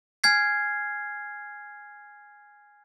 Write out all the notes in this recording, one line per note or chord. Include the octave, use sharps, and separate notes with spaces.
G#5 F6 G#6 C7